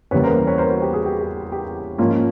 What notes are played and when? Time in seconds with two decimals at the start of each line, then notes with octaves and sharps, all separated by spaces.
0.11 E2 C#3 E3 G3 A#3 B4 C#5
0.23 A#4 C5
0.47 B4 C#5
0.58 A#4 C5
0.71 F#4
0.82 G4
0.93 F#4 G#4
1.06 G4
1.21 G4
1.37 G4
1.52 G4
1.98 G#2 F3 A#3 C#4 F4